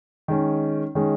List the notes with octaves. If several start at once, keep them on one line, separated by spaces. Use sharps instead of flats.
D#3 G#3 C#4
D#3 G#3 C#4